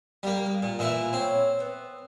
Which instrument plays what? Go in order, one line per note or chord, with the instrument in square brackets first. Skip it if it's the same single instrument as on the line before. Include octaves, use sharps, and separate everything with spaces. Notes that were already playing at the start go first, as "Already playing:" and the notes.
[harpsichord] G3 A#3 [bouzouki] G4
[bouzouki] G#3
[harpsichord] A#2 [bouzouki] A#3
[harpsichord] A#2 E3 E4
[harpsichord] C4 [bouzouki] C#4 C#5
[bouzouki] B3 E5